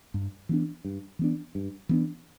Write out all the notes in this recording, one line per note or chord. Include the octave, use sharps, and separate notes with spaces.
G2
E3 B3 D4
G2
E3 B3 D4
G2
E3 B3 D4